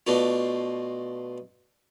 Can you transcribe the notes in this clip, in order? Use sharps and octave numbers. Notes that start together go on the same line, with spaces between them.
B2 A3 D4 F4